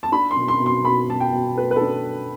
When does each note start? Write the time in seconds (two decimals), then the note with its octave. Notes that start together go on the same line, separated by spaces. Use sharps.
0.03 A5
0.12 D4 B5
0.31 C6
0.36 B2
0.48 C6
0.60 B2
0.66 C6
0.84 B2 B5
1.09 B2 A5
1.20 G5
1.33 B2
1.57 A3 B4
1.71 B4
1.76 A4
1.81 D4